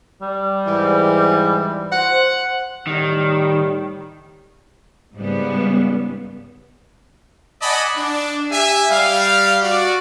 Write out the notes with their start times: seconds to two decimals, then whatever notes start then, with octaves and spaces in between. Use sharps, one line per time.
0.22 G3
0.67 G#2 E3
1.93 C5 F#5
2.87 A2 D#3 G3
5.15 G#2 C#3 G3 B3
7.62 D5 D#5 F#5 G#5 A5 B5
7.96 D4
8.52 G4 E5 G#5
8.90 G3 F5
9.63 F#4 D5